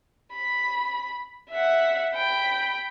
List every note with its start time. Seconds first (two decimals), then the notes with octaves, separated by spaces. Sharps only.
0.33 B5
1.51 E5 F#5
2.15 G5 B5